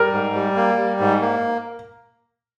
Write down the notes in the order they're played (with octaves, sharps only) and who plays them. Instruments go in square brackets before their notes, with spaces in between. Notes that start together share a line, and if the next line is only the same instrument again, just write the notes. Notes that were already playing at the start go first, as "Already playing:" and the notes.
Already playing: [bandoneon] G3 [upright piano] A#4
[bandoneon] G#2
G3
A#3
G3
G#2
A#3